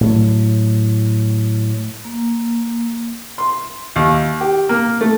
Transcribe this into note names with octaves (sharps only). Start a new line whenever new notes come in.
A2 F#3
A#3
C6
D#2
G4
A#3
A3